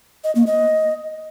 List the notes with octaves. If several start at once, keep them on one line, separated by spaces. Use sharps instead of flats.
D#5
A#3
D#5